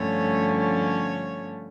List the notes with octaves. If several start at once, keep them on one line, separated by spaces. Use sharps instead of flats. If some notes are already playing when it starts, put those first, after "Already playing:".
Already playing: G2 D3 F3 A3 C#4 C#5
C#5